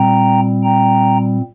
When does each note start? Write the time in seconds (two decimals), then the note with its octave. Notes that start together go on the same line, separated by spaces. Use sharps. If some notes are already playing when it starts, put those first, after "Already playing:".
Already playing: A#2 G3 C4 G5 A#5
0.63 G5 A#5